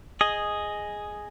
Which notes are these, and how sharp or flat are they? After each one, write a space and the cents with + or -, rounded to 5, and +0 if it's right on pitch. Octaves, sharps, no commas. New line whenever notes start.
G#4 +0 D#5 +0